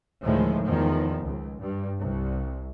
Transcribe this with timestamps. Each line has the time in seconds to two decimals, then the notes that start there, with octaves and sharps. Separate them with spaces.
0.24 D2 A2 D#3 F3 G#3
0.65 E2 D#3 F3
1.24 C#2
1.60 G2
1.99 C2